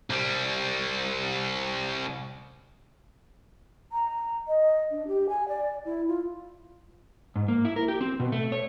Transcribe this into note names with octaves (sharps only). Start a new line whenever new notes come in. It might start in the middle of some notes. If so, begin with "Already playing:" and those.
C2 G3
A#5
D#5
D4
G4
G#5
D5
E4
F4
G#2
A#3
E4
A#4
G4
C4
B2
A3
C#5